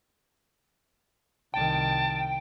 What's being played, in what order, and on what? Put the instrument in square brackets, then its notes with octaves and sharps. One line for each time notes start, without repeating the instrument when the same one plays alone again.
[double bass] C2 D#3 [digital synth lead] G5 [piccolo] A5